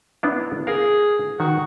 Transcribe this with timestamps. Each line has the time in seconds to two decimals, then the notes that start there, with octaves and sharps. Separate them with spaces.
0.23 B3 D4 E4
0.67 G#4 A#4 F5
1.40 D#3 F#4